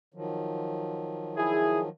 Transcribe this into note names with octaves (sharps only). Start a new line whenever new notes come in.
D#3 F3 F#3
E4 G#4